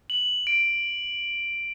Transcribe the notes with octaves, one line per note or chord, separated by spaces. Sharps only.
F#7
D7